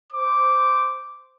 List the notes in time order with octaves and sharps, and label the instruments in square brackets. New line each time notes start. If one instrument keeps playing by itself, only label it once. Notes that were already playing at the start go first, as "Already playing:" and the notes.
[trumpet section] C5 D6